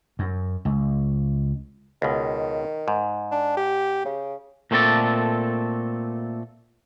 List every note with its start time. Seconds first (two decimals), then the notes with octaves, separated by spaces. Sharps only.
0.19 F#2
0.65 C#2
2.02 C#2 B2 D#3
2.88 G#2
3.32 D4
3.57 G4
4.05 C#3
4.71 A#2 A3 C4 G#4 A4 D5